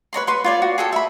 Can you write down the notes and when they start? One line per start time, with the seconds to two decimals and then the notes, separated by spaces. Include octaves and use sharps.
0.13 B4 C#5 A#5 C6
0.27 B4 C6 C#6
0.44 F4 C#5 D5
0.62 F#4
0.78 G#4 A4 G5
0.92 E5 B5